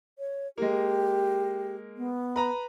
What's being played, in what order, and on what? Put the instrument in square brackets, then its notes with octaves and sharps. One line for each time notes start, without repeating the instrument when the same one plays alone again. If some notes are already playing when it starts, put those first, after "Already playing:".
[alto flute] C#5
[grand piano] G#3 A#3 [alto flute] G4
[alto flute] B3
[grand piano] B4 A#5 B5